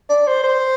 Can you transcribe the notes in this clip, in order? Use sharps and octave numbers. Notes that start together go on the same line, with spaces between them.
D5
C5
C5